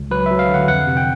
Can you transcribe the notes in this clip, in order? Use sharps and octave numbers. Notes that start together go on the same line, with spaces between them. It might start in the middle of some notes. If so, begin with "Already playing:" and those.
Already playing: C#2
F#3 B4
F#3 E5
F5
D3
F#5
F2 F#5
C3
G5